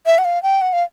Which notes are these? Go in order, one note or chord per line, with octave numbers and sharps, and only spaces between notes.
E5
F#5
F5
G5
F#5
F5